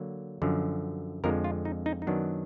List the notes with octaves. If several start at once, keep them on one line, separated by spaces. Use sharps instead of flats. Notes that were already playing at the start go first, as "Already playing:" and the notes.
Already playing: D3 F#3 A#3
F#2 D3 F3
F2 D3 F3 G#3 A#4
F4
D#4
D#4
D#4
F#2 D#3 F#3 B3 D4